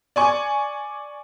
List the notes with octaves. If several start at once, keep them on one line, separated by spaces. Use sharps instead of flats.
D5 G#5 C#6